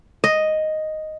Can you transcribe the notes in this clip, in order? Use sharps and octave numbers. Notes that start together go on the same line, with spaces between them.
D#5